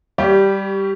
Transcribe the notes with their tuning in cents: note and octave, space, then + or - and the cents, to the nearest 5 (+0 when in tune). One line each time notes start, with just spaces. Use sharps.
G3 +0 G4 -10 C#5 +30